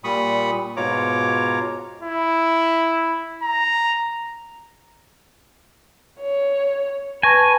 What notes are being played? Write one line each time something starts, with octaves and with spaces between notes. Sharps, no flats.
A#2 G3 B5 C#6 D#6
G#2 B2 F4 C#5 A#5 D6
E4
A#5
C#5
B4 G#5 A5 C#6 A#6